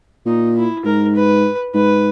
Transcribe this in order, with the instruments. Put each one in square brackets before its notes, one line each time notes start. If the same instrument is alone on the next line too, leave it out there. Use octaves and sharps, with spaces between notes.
[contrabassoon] A#2 [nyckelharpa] D#4
[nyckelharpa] E4
[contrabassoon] G#2 [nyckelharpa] A#4
[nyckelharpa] B4
[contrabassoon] G#2 [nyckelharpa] B4